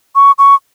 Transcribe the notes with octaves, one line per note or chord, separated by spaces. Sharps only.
C#6
C#6